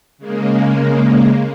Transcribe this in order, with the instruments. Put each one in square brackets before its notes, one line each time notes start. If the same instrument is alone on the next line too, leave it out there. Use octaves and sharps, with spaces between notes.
[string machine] C#3 G#3 A#3